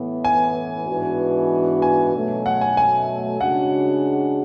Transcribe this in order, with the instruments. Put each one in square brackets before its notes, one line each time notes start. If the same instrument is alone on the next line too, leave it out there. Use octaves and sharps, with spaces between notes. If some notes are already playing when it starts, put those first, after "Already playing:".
Already playing: [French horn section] A2 E3 B3
[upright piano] G#5
[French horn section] G#2 E3 B3 D4 F#4
[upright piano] G#5
[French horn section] B2 F#3 A3
[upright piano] F#5
G#5
G#5
[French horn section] C#3 G#3 D4 F#4 [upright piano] F#5